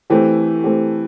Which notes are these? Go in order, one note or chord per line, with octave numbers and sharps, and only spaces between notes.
E3 A3 C4 G4
A3 C4 G4